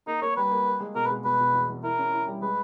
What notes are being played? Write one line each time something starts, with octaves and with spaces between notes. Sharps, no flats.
A#3 D#4
A#3 C#5
G3 B4
A#3
A#4
G#3
B2 A#4
B4
G#3
B2 B4
B2
E2
E2
E4 A#4
C#4
E4
G3
G#3 B4